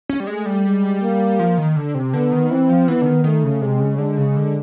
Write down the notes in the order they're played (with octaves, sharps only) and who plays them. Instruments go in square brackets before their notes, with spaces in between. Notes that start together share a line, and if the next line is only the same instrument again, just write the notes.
[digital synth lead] C#4
G3
[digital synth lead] G#3 [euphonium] A3
[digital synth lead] G3
[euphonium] G#3
A#3
[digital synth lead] F3
D#3
D3
C3
[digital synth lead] D3 [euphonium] B3
[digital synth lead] D#3
[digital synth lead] E3 [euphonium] C4
[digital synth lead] F3
[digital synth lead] E3 [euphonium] B3
[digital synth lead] D3
D#3
[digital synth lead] D#3 [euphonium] A3
[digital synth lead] C#3
[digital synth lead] C3 [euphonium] G#3
[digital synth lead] C#3
[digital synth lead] D3 [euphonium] G#3
[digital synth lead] C#3
D3